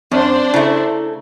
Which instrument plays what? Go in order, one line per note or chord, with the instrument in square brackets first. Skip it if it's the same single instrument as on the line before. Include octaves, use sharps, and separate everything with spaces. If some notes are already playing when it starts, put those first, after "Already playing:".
[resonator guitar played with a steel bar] F#2 [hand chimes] C4 [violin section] D4 C5
[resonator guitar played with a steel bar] C#3 A3 [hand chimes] E4 A5